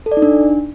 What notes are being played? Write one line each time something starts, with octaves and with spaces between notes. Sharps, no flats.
A4
D5
D#4
D4